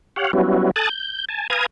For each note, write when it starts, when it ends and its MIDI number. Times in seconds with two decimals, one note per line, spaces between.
0.16 0.32 67
0.16 0.32 73
0.16 0.32 77
0.16 0.32 78
0.33 0.71 54
0.33 0.71 55
0.33 0.71 59
0.33 0.71 61
0.33 0.71 64
0.33 0.71 66
0.76 0.89 69
0.76 0.89 80
0.76 0.89 81
0.76 0.89 87
0.76 0.89 90
0.76 0.89 93
0.90 1.25 91
1.29 1.47 80
1.29 1.47 81
1.50 1.66 71
1.50 1.66 77
1.50 1.66 80
1.50 1.66 82
1.50 1.66 87
1.50 1.66 92